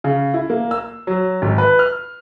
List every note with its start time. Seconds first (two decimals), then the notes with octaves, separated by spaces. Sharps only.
0.04 C#3
0.34 E4
0.50 A#3
0.71 E6
1.07 F#3
1.42 G#1
1.58 B4
1.79 F6